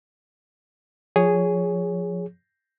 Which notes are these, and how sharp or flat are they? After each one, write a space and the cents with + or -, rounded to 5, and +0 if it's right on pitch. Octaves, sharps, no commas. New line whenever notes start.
F3 +20 G#4 -5 C#5 +10